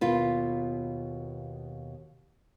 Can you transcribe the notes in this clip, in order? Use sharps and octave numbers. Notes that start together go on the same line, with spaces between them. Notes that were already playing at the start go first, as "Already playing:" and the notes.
D#2 B2 F4 B4